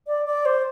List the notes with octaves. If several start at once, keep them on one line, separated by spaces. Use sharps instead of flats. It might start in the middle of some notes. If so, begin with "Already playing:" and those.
D5
D5
C5